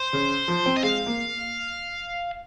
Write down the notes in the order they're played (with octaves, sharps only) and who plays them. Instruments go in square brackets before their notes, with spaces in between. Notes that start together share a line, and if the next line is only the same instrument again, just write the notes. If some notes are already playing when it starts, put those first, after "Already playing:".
Already playing: [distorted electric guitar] C5
[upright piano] C#3
F3
C4
[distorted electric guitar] D#5
[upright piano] G#3 [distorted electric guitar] F5
[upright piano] A#3